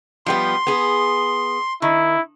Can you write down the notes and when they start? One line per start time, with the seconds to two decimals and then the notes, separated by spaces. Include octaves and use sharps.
0.26 F3 G3 B3 C6
0.67 B3 G#4
1.82 D#3 E4